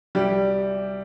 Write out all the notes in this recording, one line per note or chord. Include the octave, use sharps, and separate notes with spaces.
C2 G3 G4